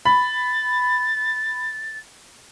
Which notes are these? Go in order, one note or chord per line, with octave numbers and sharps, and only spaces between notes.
B5 A6